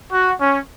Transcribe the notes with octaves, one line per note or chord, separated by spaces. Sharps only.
F#4
C#4